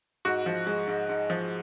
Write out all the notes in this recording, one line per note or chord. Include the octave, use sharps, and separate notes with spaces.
G#2 F#4
F3
G#3
G#2
G#2
F3